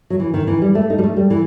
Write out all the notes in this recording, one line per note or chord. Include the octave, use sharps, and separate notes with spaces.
F#3
E3
D#3
E3
G3
A3
D#4
G3
A3
G3
E3